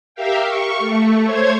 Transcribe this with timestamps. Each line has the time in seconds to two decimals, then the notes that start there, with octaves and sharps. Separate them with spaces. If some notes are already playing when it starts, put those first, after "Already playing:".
0.15 G4 A#4 E5 F5 G5
0.46 C#6
0.78 A3
1.25 C5 C#5 G#6